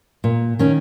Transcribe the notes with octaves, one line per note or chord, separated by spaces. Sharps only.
A#2
D#3 C#4